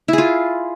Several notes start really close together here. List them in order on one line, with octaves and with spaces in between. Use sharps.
E4 G#4 F4